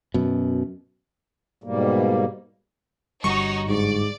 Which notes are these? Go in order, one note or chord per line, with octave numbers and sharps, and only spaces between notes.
F#2 B2
G#2 B2 G3 A#3
G1 D3 G3 D#4 F#4 C#5 C#6
G#2 D5